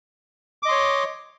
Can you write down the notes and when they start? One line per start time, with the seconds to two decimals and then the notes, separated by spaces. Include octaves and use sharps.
0.63 D6
0.66 D#5
0.68 C6
0.71 C#5